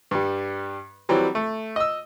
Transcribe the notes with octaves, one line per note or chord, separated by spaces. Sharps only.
G2 G3
E3 F#3 G3 C4
A3
D#5 E6